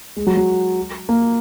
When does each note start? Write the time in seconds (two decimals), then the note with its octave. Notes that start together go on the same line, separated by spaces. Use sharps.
0.17 G#3
0.27 F#3
0.37 F#3
1.09 A#3